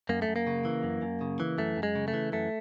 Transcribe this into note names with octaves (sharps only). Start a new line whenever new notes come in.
F#2 A#3
A3
F#2
A#3
C#3
E3
F#2
F#2
C#3
E3
F#2 A3
F#2
G#3
C#3
A3
E3
F#2 A3